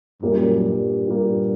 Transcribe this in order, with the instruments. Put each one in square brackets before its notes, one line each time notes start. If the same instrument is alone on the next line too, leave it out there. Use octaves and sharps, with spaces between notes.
[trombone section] F#2 [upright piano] A#2 G3 A#3
[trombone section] G2
[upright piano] A#2 G3 A#3